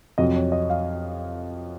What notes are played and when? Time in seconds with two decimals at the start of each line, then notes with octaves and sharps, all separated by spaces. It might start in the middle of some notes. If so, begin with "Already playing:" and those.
0.18 F2 C3 F#3 D#5
0.35 C#5
0.52 D#5
0.70 F5